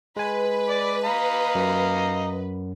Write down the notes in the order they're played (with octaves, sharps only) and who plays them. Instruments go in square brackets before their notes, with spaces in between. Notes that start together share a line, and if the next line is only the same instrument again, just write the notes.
[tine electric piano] G#3 G#5 [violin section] B4
[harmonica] D5 D6
D#5 F5 A#5
[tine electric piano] F#2